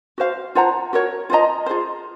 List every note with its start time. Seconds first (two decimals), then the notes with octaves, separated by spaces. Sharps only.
0.18 F#4 C5 F5
0.55 F4 C5 F#5 A#5
0.93 F#4 A#4 C#5
1.30 F4 C5 D#5 A#5
1.66 F4 G#4 C5